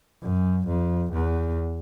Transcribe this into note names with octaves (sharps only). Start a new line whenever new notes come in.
F#2
F2
E2